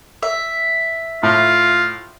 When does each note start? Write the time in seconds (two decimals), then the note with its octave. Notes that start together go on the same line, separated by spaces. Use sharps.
0.22 E5
1.23 A2 F4